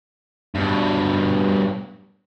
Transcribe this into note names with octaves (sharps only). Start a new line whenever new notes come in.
G2 B2